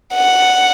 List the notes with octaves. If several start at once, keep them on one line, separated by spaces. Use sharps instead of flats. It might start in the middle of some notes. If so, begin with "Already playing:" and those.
F#5